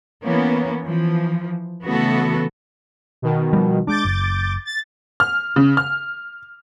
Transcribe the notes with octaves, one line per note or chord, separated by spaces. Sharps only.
E3 A#3 B3 C#4
E3 F3
C#3 E3 A3 B3 F#4 A4
B2 D#3
F3 G3
G#3 D4 D6 G6 A6
F#1
A6
F6
C#3
F6